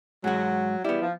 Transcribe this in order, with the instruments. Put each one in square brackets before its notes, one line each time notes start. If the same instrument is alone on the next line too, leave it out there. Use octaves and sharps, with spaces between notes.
[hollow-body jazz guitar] G#2 F#4 [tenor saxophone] F#3
[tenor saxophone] G3 [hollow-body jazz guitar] B3 E4
[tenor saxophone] F3